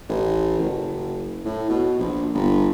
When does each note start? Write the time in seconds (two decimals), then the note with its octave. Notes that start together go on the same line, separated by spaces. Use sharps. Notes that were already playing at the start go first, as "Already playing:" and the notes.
0.09 A1
0.59 F#1
1.45 A2
1.70 B2
1.99 A#1
2.34 G1